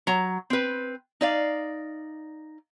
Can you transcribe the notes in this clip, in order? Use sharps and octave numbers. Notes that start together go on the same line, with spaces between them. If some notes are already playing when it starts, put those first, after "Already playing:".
F#3 A#5
C4 B4
D#4 D5 F5